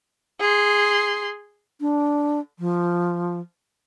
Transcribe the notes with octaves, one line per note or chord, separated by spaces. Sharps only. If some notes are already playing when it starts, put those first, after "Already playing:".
G#4 C6
D4
F3